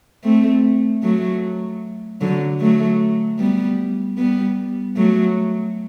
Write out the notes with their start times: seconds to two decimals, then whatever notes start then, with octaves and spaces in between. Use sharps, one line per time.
0.24 A3 C4
1.03 F#3 A3
2.21 D3 F#3
2.60 F#3 A3
3.39 G3 B3
4.18 G3 B3
4.96 F#3 A3